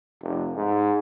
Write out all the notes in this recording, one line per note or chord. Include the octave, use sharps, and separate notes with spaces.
F1
G#2